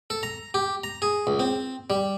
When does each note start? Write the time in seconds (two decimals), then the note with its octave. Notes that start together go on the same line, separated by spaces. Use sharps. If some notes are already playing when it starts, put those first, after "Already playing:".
0.10 A4
0.23 A#5
0.54 G4
0.84 A#5
1.02 G#4
1.27 C#2
1.40 C4
1.90 G3